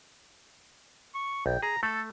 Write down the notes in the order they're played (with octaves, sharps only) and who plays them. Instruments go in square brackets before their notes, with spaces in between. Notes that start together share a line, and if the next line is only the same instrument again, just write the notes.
[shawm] C#6
[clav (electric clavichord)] B1 [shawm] G5
[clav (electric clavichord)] G#4 [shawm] A#5
[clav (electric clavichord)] A3 [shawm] A4